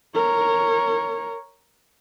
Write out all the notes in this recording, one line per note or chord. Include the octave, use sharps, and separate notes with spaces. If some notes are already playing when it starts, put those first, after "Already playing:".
A#4 C#5